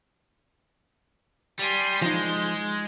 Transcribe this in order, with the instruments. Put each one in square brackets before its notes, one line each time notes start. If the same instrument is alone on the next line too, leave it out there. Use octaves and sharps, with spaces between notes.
[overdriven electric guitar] G3 [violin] G#5 C6
[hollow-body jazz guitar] F3 D#4 [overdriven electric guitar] G#3 [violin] G6